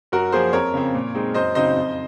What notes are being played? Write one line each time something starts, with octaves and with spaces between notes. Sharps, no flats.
F#2 F#4 A#4
F3 A#3 G#4 C5
F2 A#4 C#5
C#3 F3 C4
A#2
G#3 C4 D#4
F#2 C5 D#5
C#3 F#3 C4 D#4 C5 D#5
F2